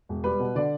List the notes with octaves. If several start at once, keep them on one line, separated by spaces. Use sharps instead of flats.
E1
G3 B4
B2
D3 D5